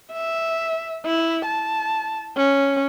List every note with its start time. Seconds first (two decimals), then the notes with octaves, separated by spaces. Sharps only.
0.12 E5
1.06 E4
1.46 A5
2.37 C#4